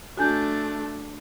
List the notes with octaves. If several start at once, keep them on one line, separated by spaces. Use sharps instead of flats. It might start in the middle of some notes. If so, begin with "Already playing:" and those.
A3 D4 F#4 G#5 G6